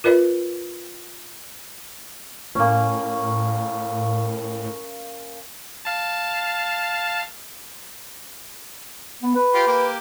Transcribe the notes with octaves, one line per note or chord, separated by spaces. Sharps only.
F4 A#4 B4 D5 E5
A2 A#3 C#4
F5 A5
B3
B4
F4 G4 C6
A#3 G4